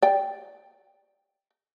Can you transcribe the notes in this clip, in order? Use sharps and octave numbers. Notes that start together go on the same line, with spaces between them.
D5 G5